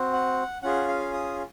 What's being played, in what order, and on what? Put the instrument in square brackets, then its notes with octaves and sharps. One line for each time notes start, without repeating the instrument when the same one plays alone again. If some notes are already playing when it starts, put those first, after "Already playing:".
Already playing: [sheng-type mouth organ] C4 F#4
F#5
C#4 F4 G#4 F#5
F5
D#6